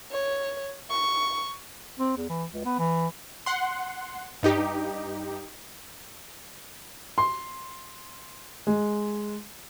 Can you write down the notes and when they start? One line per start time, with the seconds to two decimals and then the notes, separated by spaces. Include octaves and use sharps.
0.12 C#5
0.90 C#6
1.99 C4
2.18 E2
2.29 E3
2.54 C#2
2.65 B3
2.79 E3
3.46 F#5 C6
4.43 G2 D#4 G4
7.18 C6
8.67 G#3